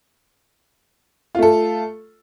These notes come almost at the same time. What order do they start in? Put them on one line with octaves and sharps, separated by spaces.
F4 A3 A4